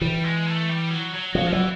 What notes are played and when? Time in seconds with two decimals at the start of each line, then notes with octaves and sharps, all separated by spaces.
0.01 E3 G3
0.24 G#3
0.47 A3
0.69 G3
0.90 F#3
1.14 F#3
1.35 F3 F#3
1.47 F3
1.52 E3 F#3